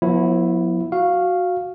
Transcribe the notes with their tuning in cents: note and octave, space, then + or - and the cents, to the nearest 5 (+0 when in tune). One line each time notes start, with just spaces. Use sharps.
F3 +40 B3 -25 E4 +0
F#4 -10 F5 +0